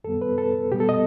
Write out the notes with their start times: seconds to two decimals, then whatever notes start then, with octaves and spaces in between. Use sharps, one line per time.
0.04 F#2 D#3 G3 B3 A4
0.21 B4
0.38 A4
0.72 B2 G3 B3 G4
0.80 A4
0.89 D#5